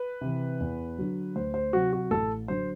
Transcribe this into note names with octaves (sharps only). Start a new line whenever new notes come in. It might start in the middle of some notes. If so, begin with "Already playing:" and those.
Already playing: B4
C3 E3
E2
D3 F#3
D2 C5
C5
C3 F#3 F#4
F#4
A1 A4
D3 F#3 C5